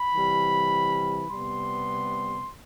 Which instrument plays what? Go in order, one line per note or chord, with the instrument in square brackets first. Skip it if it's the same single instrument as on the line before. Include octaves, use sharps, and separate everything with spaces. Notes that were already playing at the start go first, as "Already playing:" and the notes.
Already playing: [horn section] B5
C3 E3 G3
C3 G3 B3 C6